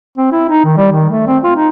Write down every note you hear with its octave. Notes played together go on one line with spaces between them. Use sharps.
C4
E4
D#4
D#3
G3
D#3
A3
C4
F4
D#4